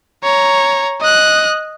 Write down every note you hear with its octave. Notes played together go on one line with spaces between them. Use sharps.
C#5 A#5
D#5 F#6